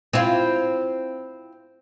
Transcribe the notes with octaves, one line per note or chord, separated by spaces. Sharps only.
C4 E4 F4